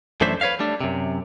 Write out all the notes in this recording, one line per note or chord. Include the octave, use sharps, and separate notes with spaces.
F#2 E3 A3 D4 C5 E5
B4 C#5 E5 F5
G3 A3 D4
F#2 C3